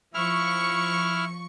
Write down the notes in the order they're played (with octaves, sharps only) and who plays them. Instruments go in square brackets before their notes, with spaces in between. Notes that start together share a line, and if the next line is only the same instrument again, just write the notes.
[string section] F3 C#6 [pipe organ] E4 F6